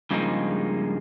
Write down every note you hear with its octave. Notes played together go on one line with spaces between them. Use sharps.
G2 C#3 F3 G#3 A#3 D#4